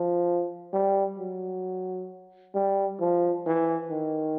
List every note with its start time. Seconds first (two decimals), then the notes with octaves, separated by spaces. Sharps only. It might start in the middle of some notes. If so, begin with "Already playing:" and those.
Already playing: F3
0.73 G3
1.19 F#3
2.54 G3
3.00 F3
3.46 E3
3.90 D#3